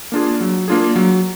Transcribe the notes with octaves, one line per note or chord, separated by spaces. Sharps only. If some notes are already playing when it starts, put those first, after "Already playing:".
A#3 D4 F4 G#4
F#3
A#3 D4 F4 G#4
F#3